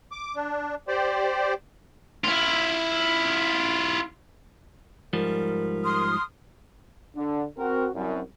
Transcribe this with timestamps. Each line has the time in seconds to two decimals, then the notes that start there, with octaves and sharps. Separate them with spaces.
0.12 D6
0.35 D4
0.88 G4 C5 D5
2.24 E4 F4
5.13 G#2 F3 G3 A#4
5.84 C6 D#6 F6
7.16 D3
7.58 C4 F#4 A#4
7.95 C2 F#2